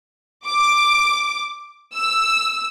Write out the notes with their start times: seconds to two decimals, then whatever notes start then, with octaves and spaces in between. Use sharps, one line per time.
0.46 D6
1.94 E6